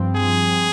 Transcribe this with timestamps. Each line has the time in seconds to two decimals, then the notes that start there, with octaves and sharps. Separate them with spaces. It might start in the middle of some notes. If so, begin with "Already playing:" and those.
Already playing: G2 F3 C4
0.16 G#4